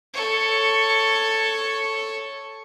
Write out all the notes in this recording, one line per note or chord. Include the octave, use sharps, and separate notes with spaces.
A4 C#5